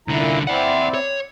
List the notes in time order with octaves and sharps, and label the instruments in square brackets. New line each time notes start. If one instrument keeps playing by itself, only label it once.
[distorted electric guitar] C2 D3 [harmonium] A#2 E4 A#5
[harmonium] C4 E4 D5 [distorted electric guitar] E5 F#5
[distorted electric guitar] C#5